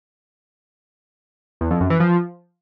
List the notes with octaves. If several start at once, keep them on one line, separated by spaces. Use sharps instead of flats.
E2
F2
F#2
E3
F3